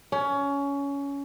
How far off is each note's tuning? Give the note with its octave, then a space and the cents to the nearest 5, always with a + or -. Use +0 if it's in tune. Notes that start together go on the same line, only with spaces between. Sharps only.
C#4 +20